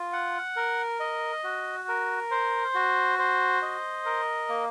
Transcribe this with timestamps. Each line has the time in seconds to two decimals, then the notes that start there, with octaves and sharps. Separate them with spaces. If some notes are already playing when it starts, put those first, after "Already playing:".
Already playing: F4
0.13 F#5
0.56 A#4
1.00 D#5
1.44 F#4
1.88 A#4
2.31 C5
2.75 F#4
3.19 C5
3.62 D#5
4.06 A#4
4.49 A#3